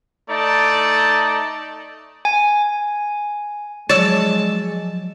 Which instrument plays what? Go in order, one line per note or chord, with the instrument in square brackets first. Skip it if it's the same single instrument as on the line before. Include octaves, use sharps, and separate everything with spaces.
[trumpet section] A3 D#4 D5 A5
[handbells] G#5
[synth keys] F3 F#3 [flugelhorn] G#3 [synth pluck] C#5 D5 E6 [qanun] A5